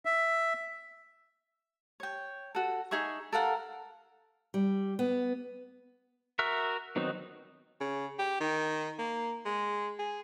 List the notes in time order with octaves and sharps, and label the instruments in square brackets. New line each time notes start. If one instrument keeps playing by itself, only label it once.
[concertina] E5
[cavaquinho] C#5 G5
F#4 A4
D#4 G#4 E5 C#6
A4 A#4 F5 F#5
[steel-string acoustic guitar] G3
B3
[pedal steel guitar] F#4 A#4 E5
D#3 F#3 B3 C4 D#4
[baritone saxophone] C#3
G4
D#3
A#3
G#3
G#4